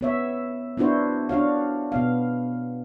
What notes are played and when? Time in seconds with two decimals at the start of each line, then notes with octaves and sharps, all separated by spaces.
0.01 B3 C#5 E5
0.77 B3 D4 E4 F#4 C5
1.29 D4 F#4 C#5 F5
1.92 B2 B3 F5